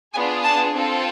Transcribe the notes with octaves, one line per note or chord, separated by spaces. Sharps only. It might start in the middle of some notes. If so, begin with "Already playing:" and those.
B3 D4 F4 G#4 G#5
A5
C4 F4 A4